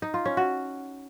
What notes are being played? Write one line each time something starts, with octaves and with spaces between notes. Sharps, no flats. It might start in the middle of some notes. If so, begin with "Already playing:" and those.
D#4
F4
C#4
F#4